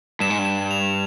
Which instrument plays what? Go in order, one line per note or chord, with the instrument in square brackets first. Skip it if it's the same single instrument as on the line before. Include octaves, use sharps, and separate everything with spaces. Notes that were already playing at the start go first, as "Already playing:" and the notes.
[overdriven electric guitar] G2 [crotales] E7
[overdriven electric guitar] G#2
G2
[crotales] E7
F7